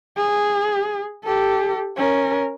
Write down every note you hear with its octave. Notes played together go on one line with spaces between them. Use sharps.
G#4
G4 A4
C#4 A#4